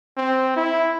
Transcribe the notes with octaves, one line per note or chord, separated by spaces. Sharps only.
C4
E4